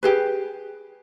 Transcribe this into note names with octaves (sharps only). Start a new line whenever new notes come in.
G4 G#4 B4